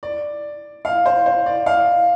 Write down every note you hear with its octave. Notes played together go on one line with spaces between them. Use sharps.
D5
F5
C5
C5
D5
F5